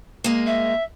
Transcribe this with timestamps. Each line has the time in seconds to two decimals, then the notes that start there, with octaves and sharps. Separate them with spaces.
0.24 G#3 A#3
0.46 E5